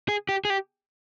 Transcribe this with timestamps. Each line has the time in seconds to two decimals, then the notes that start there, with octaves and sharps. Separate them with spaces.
0.09 G#4
0.29 G4
0.45 G#4
0.50 G4